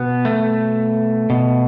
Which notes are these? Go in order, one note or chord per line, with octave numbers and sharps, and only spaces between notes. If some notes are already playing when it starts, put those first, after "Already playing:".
Already playing: B2 B3
A3
B2